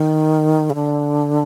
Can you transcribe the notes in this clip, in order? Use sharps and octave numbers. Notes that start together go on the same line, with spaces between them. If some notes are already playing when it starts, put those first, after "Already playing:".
Already playing: D#3
C#3
D3